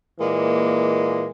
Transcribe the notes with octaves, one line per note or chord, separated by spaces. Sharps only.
A#2 E3 G#3 A#3